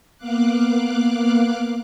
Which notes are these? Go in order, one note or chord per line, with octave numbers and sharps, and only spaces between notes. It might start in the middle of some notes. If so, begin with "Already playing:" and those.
A#3 B3 F5 D6 F#6